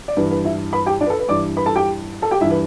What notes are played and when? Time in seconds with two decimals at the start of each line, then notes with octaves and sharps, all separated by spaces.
0.08 D5
0.17 G2 E3 B4
0.31 B4
0.45 E4 E5
0.73 B4 B5
0.86 G4 G5
1.01 D4 D5
1.06 B4
1.10 A4
1.20 B4
1.29 G2 E3 D5 D6
1.56 B4 B5
1.66 A4 A5
1.76 G4 G5
2.22 A4 A5
2.31 G4 G5
2.41 G2 E3 E4 E5
2.51 B4